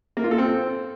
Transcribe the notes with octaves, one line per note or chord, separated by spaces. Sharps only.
A#3
F4
A4
C4